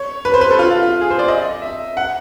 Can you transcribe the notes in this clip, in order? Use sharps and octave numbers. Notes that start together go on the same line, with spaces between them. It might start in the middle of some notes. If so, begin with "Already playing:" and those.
Already playing: C#5
B4
C5
B4
A4
F4
F4
F4
G#4
C5
D5
D#5
E5
F#5